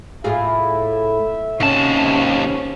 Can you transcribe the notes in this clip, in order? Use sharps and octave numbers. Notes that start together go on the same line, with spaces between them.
A2 F4 G#4 E5
D#2 C3 C#4 A5